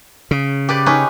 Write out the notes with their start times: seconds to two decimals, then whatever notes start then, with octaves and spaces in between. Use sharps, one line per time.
0.31 C#3
0.69 G4 B4 D5
0.86 C#4 D#4 B4